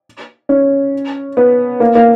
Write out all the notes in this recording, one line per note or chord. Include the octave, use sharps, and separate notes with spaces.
C#4
B3
A#3
A#3